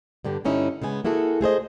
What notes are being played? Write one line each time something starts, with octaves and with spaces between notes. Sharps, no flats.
G2 D3 G4
G2 D3 C#4 D#4 E4
C#3 G#3 B3 G#5
A#3 E4 F#4 G#4 A4
A3 G#4 C5 D#5